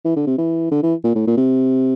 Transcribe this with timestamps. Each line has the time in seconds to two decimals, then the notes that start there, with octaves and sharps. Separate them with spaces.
0.05 E3
0.16 D3
0.26 C3
0.38 E3
0.71 D3
0.83 E3
1.04 A#2
1.15 A2
1.27 A#2
1.37 C3